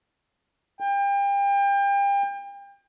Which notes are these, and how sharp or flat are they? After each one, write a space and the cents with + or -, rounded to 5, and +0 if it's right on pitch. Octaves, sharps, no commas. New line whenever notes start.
G5 +35